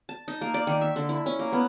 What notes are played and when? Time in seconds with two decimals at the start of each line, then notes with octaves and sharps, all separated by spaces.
0.09 A5
0.28 D#4
0.41 A#3
0.54 D5
0.67 D#3
0.81 E5
0.96 D3
1.09 E4
1.26 C#4
1.39 A#3
1.52 B3